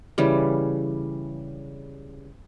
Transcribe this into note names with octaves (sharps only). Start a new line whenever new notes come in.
C#3 E3 G3